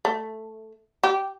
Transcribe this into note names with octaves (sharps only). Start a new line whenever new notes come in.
A3
G4